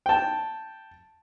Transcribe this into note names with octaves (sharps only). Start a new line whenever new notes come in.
G5 A5